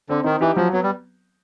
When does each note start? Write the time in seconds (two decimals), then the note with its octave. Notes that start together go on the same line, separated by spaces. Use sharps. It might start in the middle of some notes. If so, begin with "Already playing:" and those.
0.09 D3 C4
0.24 D#3 D#4
0.40 E3 G4
0.56 F3 F#3
0.72 F#3 B3
0.83 G3